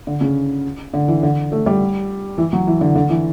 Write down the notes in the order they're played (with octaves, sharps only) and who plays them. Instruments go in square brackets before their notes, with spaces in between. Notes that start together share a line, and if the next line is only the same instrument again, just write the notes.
[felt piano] D3
C#3
D3
E3
D3
A3
G3
E3
F#3
E3
D3
D3
E3